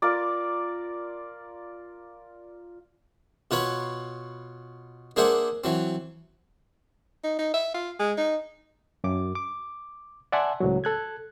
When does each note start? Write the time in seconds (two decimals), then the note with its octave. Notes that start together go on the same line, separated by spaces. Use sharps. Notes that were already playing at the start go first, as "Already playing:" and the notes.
0.02 F4 A#4 D5
3.51 B2 F4 B4 C#5 B5
5.16 A#3 D4 G#4 C5 E5 F#5
5.64 E3 F#3 C4
7.24 D#4
7.39 D#4
7.54 E5
7.74 F4
8.00 G#3
8.18 D#4
9.04 F#2 D6
9.35 D6
10.32 D5 E5 F#5 G#5 A5 C6
10.60 C#2 A2 F#3
10.84 A4 F#6 G#6